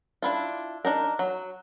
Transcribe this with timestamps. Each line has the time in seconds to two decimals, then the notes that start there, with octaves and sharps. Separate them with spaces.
0.22 D4 E4 F4
0.85 D4 D#4 A#4
1.19 F#3